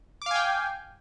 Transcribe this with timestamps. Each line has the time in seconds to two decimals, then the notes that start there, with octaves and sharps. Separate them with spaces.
0.22 D6
0.26 F5
0.31 G#5
0.36 G5